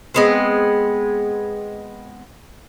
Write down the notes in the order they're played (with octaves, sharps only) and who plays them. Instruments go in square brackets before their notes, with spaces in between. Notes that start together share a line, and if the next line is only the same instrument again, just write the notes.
[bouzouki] G#3 B3 C4